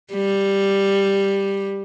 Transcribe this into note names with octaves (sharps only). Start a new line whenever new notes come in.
G3